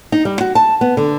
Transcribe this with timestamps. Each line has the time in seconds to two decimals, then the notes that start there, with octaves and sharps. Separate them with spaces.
0.12 D#4
0.25 G3
0.41 F#4
0.55 A5
0.81 B3
0.97 D3